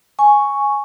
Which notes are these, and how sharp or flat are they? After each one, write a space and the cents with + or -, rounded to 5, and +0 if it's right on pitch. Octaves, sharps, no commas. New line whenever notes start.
G#5 +0 C#6 +0